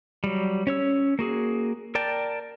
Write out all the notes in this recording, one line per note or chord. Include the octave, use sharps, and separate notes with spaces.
F#3 G3
C#4 C#5 E6
A#3 F#4 G#4
A#4 D5 G5 A5